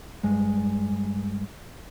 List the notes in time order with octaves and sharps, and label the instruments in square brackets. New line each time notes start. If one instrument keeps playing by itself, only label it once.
[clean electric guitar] G2 G#3